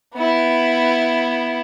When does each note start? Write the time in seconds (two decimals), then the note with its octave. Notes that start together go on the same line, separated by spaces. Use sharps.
0.14 B3 E4